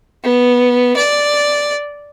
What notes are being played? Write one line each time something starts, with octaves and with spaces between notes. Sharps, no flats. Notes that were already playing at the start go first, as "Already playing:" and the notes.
B3
D5